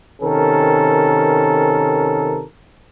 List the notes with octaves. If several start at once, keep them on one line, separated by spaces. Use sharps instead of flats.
C3 D#3 C#4 A4 A#4